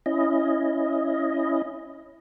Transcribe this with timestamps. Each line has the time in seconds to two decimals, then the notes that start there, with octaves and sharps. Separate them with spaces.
0.06 C#4 E4 D#5